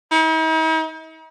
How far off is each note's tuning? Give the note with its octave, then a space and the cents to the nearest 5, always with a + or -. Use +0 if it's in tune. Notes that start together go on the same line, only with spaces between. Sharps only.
D#4 +45